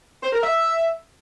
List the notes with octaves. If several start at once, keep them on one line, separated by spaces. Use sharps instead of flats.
C5
A#4
E5